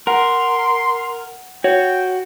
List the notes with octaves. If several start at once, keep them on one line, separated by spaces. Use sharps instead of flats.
A#4 F#5 C6
F#4 C#5 G5